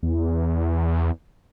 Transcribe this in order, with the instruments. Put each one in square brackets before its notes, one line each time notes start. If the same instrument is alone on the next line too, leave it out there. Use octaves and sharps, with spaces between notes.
[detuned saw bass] E2